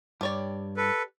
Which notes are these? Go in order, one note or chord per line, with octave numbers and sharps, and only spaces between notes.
G2 G4 C#5 D5
A4 B4